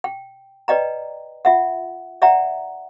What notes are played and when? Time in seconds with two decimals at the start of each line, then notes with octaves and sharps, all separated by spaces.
0.04 G5
0.68 B4 D5 D#5 G5 A#5
1.45 F4 E5 F#5
2.22 D5 E5 F#5 G5 A#5